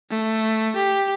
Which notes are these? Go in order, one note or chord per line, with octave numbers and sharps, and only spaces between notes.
A3
G4